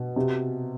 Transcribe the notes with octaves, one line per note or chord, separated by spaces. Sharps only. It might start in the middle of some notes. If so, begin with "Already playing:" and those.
Already playing: B2
C3